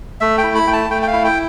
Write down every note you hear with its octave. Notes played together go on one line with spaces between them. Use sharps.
A3 E5
G5
E4
B5
A3 G5
A5
A3 G5
G5
F5
E4
G5